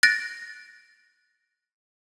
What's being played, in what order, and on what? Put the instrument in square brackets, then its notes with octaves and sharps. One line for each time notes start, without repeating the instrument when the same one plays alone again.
[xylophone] F#6 A6 A#6 D7